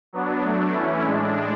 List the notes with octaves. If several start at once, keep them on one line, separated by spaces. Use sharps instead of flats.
F#3 B3 D4
F#3 A3 D4
E3 A3 C#4 E4
A2 G#3 D4